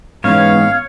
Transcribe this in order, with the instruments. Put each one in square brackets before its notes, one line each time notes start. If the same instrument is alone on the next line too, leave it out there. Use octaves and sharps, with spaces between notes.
[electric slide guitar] G#2 E3 C#4 [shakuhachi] B3 [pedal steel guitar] C#5 [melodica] F5